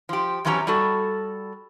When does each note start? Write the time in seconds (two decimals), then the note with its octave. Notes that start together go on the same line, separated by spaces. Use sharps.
0.09 F3 G4
0.45 F2 E3 F#3 C#4 G4 A#5
0.67 G3 F#4 A4